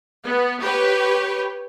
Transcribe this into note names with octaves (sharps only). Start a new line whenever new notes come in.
B3
G4 B4 C#5